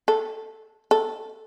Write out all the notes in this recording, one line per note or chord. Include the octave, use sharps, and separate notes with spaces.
A4
A4